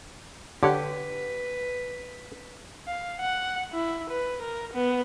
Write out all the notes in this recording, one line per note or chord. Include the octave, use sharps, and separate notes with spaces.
D3 G4 B4 C#5 F#5
F5
F#5
E4
B4
A#4
B3